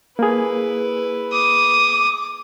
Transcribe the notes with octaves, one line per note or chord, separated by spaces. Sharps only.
A#3 E4 G#4 B4
D6 D#6